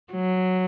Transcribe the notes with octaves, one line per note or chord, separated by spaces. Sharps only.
F#3